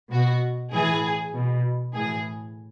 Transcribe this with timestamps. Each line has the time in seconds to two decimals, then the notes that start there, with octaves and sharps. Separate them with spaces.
0.11 B2 F#4
0.72 A2 E3 G#4
1.33 B2
1.93 A2 E3 G#4